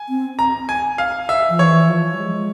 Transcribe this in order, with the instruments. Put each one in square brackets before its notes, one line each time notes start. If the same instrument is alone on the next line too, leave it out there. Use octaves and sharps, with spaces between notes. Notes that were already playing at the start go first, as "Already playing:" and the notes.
Already playing: [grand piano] G#5
[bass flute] C4
[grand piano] A#5
G#5
F5
E5
[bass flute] F3
[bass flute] E3 [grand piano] C#5
[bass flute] F3
G3
G#3